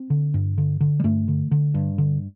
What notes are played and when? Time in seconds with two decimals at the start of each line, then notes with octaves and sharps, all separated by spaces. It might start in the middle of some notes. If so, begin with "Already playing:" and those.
Already playing: C4
0.10 D3
0.34 G2
0.58 D3
0.81 D3
1.00 G3
1.04 G2 A3
1.28 D3
1.51 D3
1.74 G2
1.98 D3